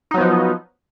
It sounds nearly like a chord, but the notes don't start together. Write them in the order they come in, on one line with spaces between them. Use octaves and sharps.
D#4 F#3 B3 F3